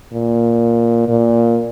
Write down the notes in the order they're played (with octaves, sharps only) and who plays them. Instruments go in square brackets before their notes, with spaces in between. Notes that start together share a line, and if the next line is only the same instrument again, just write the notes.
[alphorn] A#2
A#2